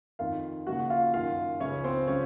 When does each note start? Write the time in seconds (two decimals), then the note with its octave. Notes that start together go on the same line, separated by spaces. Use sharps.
0.19 F2 D#3 F4 F5
0.67 D#2 C#3 F3 F#4 F#5
0.90 F4 F5
1.13 F#2 D#3 F4 F5
1.60 C#2 C#3 F3 C#4 C#5
1.84 C4 C5
2.08 C#3 F3 C#4 C#5